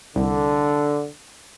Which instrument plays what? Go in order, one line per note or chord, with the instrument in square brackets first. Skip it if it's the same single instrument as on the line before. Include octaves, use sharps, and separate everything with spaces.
[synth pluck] C2 [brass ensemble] D3